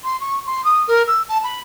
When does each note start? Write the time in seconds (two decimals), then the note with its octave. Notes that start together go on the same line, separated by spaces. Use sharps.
0.04 C6
0.20 C#6
0.46 C6
0.65 D#6
0.88 A#4
1.07 E6
1.29 A5
1.44 B5